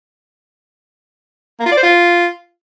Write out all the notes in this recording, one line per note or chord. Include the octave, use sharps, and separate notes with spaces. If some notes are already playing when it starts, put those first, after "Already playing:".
A#3
F4
D5
C5
F4